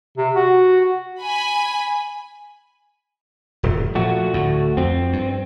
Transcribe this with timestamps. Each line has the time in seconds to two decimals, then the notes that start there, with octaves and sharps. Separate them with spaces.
0.17 C3
0.35 F#4
1.21 G#5 B5
3.63 D#1 F#2 A2
3.95 A#2 F3 A3 F#4
4.34 D2 A2
4.77 F2 C4
5.13 G2